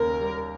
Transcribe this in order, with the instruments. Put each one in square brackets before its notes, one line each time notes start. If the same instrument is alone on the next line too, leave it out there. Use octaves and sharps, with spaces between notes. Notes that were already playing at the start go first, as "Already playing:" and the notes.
Already playing: [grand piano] D#2 C#3 A#3 [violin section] A#4
[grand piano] G3